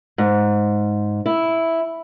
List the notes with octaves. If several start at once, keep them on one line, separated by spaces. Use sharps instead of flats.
G#2
E4